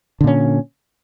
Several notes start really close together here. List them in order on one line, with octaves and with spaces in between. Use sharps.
D3 A#2 C#4